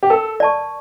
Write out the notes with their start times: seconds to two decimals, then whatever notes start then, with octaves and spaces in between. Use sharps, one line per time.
0.03 G4
0.10 A4 A#4
0.40 D5 A5 C#6